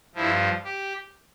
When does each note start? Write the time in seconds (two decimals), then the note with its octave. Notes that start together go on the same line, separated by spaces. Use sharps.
0.15 G2 F3 E4
0.64 G4